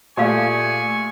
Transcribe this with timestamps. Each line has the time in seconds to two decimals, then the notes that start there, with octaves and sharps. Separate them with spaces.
0.17 A#2 A3 G4 G#4 D5 F5 G#5 C#6